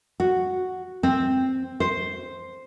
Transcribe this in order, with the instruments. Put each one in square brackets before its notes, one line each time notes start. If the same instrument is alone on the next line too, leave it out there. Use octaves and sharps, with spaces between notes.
[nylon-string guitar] F#4
C4
C5